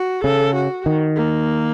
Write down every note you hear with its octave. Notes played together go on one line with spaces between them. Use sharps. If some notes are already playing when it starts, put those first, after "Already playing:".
Already playing: F#4
C#3 A4
F#4
D#3
A#3